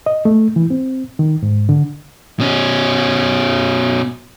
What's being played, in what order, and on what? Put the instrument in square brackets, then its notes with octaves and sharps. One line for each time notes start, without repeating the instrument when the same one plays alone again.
[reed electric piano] D#5
A3
E3
C4
D#3
G#2
D3
[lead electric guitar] B2 C#4